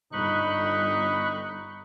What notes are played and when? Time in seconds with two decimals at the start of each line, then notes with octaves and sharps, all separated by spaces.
0.13 G1 D#4 B5 C#6 F#6